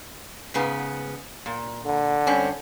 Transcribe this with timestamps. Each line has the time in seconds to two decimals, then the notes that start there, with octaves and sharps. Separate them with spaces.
0.54 G#2 C#3 B3
1.46 A#2
1.85 D3
2.27 G2 C4 C#4